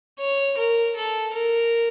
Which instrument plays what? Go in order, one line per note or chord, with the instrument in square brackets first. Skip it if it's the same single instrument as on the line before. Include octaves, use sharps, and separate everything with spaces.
[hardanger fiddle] C#5
A#4
A4
A#4